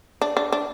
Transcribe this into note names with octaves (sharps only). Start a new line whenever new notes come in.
D4
D4
D4